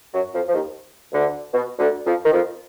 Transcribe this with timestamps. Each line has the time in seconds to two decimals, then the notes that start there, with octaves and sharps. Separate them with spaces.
0.13 F#2 F#3
0.34 F2 F3
0.48 F3
0.53 D#2 D#3
1.12 D2 D3
1.53 B2
1.79 D2 D3
2.05 F2 F3
2.24 D#3
2.32 F2 F3